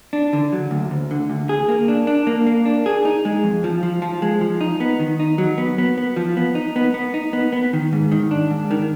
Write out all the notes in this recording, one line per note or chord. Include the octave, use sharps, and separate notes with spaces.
D4
D3
F#3
D2
D2
D3
D2
G#4
A#3
D4
D4
A#3
A#3
D4
G#4
D#4
G#3
F2
F3
F3
F3
G#3
F3
D#4
B3
D#3
D#4
F#3
B3
B3
B3
F3
B3
D#4
B3
B3
D#4
B3
B3
D#3
G#2
D#3
D4
G#2
D#3